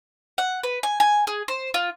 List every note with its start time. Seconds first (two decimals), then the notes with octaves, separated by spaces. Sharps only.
0.38 F#5
0.63 B4
0.83 G#5
1.00 G#5
1.27 G#4
1.48 C5
1.74 F4